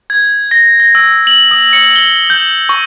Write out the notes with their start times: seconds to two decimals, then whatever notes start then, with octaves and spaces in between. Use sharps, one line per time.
0.10 G#6
0.51 A#6
0.80 A#6
0.95 E6
1.27 F#7
1.51 D#6
1.73 C#7
1.96 G7
2.30 G6
2.69 C#6